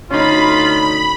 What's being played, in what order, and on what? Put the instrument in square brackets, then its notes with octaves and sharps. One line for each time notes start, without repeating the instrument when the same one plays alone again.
[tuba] D2 [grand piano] C#4 D#4 [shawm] F4 [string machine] B5